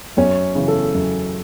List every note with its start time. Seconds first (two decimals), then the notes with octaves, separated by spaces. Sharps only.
0.17 F#2 C#4
0.55 C#3 E3
0.68 A4
0.94 F#2